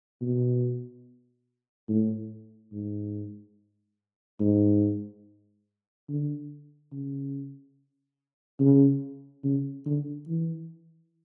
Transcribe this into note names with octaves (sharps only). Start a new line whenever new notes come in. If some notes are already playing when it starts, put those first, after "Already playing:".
B2
A2
G#2
G#2
D3
C#3
C#3
C#3
D3
E3